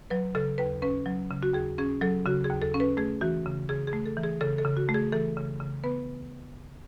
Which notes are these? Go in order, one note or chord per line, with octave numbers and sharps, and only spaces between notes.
F#3 B4
C#3 A4
D#2 B4
C#4 B4
F#3
C#3
F#4
D#2 G#4
C#4 G#4
F#3 A4
C#3 F#4
G#4
D#2
A4
C#4
B4
A3 G#4
E3 F#4
C#3
C#3 G#4
G#4
A3
A4
E3
G#4
C#3 A4
A4
C#3
F#4
A3
G#4
E3 A4
C#3
C#3
B3 B4